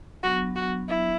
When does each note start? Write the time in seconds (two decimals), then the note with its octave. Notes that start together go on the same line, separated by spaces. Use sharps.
0.23 F#3 B3 D4 F#4
0.56 F#4
0.88 E4